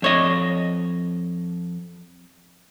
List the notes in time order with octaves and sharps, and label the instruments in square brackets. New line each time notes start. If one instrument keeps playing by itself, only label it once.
[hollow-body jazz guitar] F2 C#5 D#5